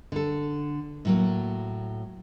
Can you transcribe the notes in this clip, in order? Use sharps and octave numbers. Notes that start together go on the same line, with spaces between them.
D3 A4
A2 F#3 A#3